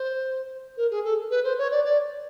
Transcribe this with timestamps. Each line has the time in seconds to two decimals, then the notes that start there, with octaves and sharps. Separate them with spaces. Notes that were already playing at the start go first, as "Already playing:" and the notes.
Already playing: C5
0.77 A#4
0.91 G#4
1.04 A4
1.31 B4
1.44 C5
1.58 C#5
1.71 D5
1.84 D5